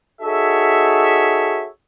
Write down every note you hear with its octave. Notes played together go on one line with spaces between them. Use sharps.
D#4 F#4 G#4 A4 C#5 E5